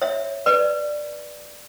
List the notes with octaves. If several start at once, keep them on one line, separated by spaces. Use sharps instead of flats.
C#5 E5
B4 D5